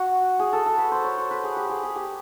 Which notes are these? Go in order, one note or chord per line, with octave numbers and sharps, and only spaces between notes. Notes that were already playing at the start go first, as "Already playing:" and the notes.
Already playing: F#4
G#4
A4
A4
B4
C5
C#5
C5
B4
G#4
G4
G#4
G#4
G4